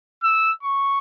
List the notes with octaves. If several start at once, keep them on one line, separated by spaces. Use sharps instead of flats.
E6
C#6